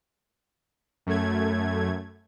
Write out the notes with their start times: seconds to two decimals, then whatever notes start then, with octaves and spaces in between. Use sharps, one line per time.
1.06 F#2 A3 G#6